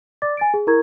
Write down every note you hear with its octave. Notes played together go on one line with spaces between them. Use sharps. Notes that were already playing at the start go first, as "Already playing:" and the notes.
D5 D6 A6
G#5 A6 D7
G#4
E4 A#4 A#5 C#6 G#6